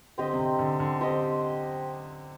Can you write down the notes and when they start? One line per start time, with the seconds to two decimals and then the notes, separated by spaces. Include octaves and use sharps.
0.18 D3 C4 G4 C5 D#5
0.33 C3
0.39 D3
0.59 D3
0.80 D3
1.01 C4 G4 C5 D#5